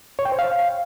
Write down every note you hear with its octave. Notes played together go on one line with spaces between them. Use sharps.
C#5
G5
C5
F5